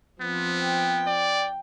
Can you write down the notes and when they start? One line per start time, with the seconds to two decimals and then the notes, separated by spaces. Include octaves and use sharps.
0.21 F3 B3 C4
0.61 G5
1.08 D5